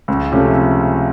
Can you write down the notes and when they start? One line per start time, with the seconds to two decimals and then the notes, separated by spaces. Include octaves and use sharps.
0.08 C#2
0.32 C3 F3 A3 C#4